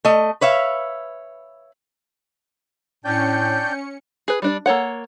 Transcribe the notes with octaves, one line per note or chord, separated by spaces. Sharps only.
A3 D#5
B4 C#5 E5 F5
A2 C#4 D4 D5 G5 G6 C#7
G#4 B4
G3 D4 D5
A#3 A4 C#5 F#5